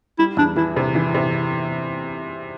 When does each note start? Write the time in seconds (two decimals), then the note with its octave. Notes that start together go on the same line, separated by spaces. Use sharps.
0.19 G3 E4
0.37 E2 D4
0.56 E3 E4
0.76 C3
0.95 E3
1.14 C3